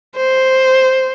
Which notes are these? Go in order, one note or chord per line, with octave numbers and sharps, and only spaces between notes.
C5